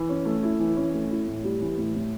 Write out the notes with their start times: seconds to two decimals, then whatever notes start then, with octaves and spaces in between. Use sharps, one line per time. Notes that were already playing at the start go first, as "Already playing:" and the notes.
Already playing: E3
0.09 C#4
0.25 A3
0.43 E4
0.59 E3
0.76 C#4
0.94 A3
1.11 E4
1.27 A2
1.44 G3
1.61 E3
1.78 A2
1.95 A2